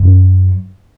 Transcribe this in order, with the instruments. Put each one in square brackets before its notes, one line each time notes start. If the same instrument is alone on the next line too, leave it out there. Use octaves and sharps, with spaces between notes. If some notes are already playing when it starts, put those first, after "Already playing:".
Already playing: [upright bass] F#2